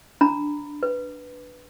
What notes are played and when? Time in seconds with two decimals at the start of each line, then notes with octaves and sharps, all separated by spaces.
0.21 D4 A#5 B5
0.83 B4